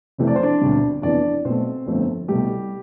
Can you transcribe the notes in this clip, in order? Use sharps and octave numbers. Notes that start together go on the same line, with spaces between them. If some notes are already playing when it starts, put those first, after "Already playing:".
F1 F2 C3 E3 A3
D5
C5
D4 D5
E1 D2 C3 G3
F1 F2 C3 E3 B3 D4 D5
B1 B2 A3 C4 C5
G1 F2 D3 F3 A3
C2 B2 G3 A3 G4